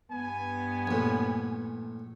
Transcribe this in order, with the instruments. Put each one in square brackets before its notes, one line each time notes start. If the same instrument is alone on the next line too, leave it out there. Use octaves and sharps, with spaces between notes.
[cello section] G2 B3 [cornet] G#5
[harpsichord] A#1 A2